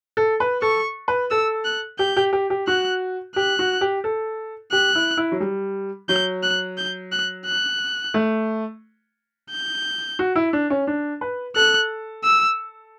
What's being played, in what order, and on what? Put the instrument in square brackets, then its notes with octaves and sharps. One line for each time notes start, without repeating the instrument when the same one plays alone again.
[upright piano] A4
B4
[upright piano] A4 [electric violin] C#6
[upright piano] B4
[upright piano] A4 [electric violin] E6
[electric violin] F#6
[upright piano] G4 [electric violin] G6
[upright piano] G4
G4
G4
[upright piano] F#4 [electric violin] F#6
[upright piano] G4 [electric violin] F#6
[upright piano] F#4
G4
A4
[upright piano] G4 [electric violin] F#6
[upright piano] E4
E4
F#3
G3
[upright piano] F#3 [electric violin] G6
[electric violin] F#6
G6
F#6
F#6
[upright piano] A3
[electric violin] G6
[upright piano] F#4
E4
D4
C#4
D4
B4
[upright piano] A4 [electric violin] F#6
[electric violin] E6